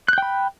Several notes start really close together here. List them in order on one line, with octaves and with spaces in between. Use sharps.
F#6 G6 G5 B5